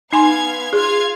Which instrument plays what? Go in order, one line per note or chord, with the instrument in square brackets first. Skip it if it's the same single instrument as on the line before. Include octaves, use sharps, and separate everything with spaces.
[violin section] B3 F5 G#6 [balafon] D#4 G#5 C6
[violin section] F4 F5 G#6 [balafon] G#4